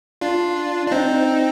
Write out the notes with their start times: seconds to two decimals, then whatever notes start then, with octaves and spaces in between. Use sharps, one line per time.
0.21 D4 F4
0.87 D4
0.91 C4 D#4